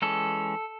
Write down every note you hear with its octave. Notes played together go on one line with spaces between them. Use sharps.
E3 G#3 C#4 A4